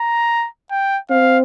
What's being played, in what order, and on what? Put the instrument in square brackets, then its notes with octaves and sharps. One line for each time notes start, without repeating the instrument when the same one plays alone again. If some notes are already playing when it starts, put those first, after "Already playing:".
Already playing: [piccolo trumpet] A#5
G5
[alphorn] C4 [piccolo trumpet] F5